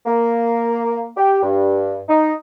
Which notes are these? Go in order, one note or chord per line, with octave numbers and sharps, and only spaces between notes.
A#3
G4
G2
D#4